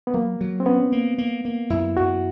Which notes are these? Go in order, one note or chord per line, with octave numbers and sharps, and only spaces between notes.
B3
F#3 A#3
F#3
C4
B3 C#4
A#3
A#3
A#3
F#2 E4
F#2 F#4